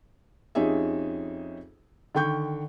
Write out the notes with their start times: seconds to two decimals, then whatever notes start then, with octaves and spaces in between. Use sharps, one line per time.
0.55 F2 C#4 D#4 G4 G#4 E5
2.15 D3 D#3 G5 C#6 G6